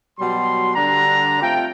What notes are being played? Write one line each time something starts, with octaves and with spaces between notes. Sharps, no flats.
B2 F#3 G3 C6
D3 G3 D4 A#5
A3 C4 F4 G5